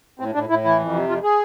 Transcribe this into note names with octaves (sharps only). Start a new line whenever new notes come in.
A2 C4
A2 D4
A2 E4
E3 E4
F2
C3
F2 F4
G#4